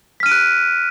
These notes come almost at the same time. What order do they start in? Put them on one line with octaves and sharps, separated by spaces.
B6 F6 D#7 D7 F#6